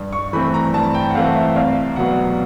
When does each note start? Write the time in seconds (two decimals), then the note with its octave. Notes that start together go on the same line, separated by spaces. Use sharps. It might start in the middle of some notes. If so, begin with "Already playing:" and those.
Already playing: G2
0.13 C#6
0.33 E3 A3 C4 B5
0.54 A#5
0.74 G2 A5
0.94 G5
1.10 F#5
1.15 E3 A3 C4 F5
1.35 E5
1.56 C2 F5
1.96 B2 F#3 B3 F#5